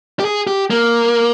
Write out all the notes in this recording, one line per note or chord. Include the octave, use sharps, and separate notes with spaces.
G4
G#4
G4
A#3